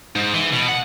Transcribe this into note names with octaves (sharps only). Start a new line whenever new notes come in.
G#2
E3
B2
F#5